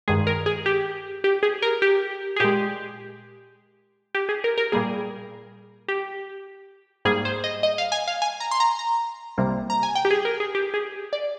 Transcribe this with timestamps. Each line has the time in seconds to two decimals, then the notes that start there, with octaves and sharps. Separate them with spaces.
0.08 G2 D#3 G#3 G#4
0.27 A#4
0.46 G#4
0.66 G4
1.24 G4
1.43 G#4
1.62 A#4
1.82 G4
2.36 G#4
2.40 A#2 G#3 G4
4.15 G4
4.29 G#4
4.44 A#4
4.58 A#4
4.72 A#2 G3 A#3 G#4
5.88 G4
7.05 G#2 G3 A#3 G#4
7.25 C5
7.44 D#5
7.63 D#5
7.78 F5
7.92 G#5
8.08 F5
8.22 G#5
8.40 A#5
8.51 C6
8.60 A#5
8.79 A#5
9.38 C2 C3 G3 A#3
9.70 A#5
9.83 G#5
9.95 G5
10.05 G4
10.11 G#4
10.25 A#4
10.40 G#4
10.55 G4
10.74 G#4
11.13 D5